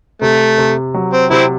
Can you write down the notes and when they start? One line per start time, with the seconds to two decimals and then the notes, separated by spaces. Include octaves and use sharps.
0.21 C3 A3
0.58 C3
0.94 F#3
1.13 C4
1.30 C3 C4 E4